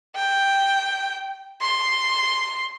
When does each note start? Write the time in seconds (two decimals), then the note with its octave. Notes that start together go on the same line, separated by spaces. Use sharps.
0.15 G5
1.61 C6